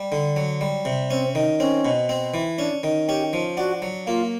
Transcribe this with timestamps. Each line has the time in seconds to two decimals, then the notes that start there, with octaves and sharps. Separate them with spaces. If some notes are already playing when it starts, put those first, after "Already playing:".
Already playing: G3
0.12 D3
0.36 F#3
0.61 G3
0.85 C3
1.11 C4 C#4
1.35 D#3
1.60 C4 C#4
1.85 B2
2.09 C4
2.34 E3
2.59 C#4 D4
2.83 D#3
3.08 C#4 G4
3.33 F3
3.57 D4 F#4
3.82 F#3
4.07 A#3 F4